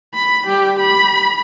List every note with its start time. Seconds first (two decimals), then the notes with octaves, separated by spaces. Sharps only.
0.15 B5
0.46 G3 G4
0.80 B5